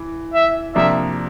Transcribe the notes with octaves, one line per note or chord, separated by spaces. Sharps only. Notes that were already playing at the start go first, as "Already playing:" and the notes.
Already playing: E3
E5
C3 F3 A#3 D4 E5